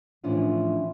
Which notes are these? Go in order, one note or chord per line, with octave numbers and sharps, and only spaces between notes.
A2 E3 F3 C#4 D4 F4